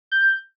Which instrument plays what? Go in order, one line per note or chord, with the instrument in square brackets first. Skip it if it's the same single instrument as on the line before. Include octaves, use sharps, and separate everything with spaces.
[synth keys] G6